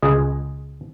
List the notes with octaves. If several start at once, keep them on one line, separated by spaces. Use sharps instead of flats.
C#2 G#4 D#5